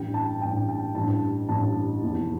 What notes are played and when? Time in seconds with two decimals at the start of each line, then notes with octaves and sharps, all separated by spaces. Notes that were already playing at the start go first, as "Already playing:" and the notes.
Already playing: A1 G2 E3 G5
0.14 A5
0.41 A1 G2 E3 G5
0.68 G5
0.95 A1 G2 E3 A5
1.49 A1 G2 E3 A5
2.03 F1 E2 E3